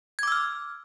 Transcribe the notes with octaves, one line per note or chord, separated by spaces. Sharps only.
D6 E6 F6 G#6